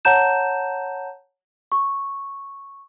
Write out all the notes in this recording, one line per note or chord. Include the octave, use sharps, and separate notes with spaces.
C#5 F#5 A5 A#5 G6 E7
C#6